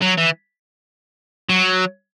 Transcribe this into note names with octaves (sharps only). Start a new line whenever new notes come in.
F#3
E3
F#3